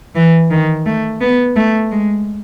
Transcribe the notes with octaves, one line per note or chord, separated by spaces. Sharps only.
E3
D#3
A3
B3
A3
G#3